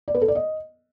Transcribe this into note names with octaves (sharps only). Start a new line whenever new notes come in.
D5
B4
A4
D5
D#5